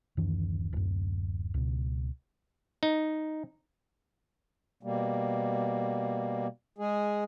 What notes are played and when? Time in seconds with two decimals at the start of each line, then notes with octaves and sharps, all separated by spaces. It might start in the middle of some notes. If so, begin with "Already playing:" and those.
0.17 D1 F#2 D#3 E3
0.73 D1 F#2
1.54 C#2 B2
2.83 D#4
4.83 B2 G3 A#3
6.78 G#3 G#4